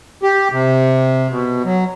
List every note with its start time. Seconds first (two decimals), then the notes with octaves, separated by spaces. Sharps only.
0.23 G4
0.52 C3
1.30 B2
1.64 F#3